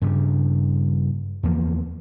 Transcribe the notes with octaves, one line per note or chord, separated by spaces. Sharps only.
G2 C#3 G3
E2 F3 A#3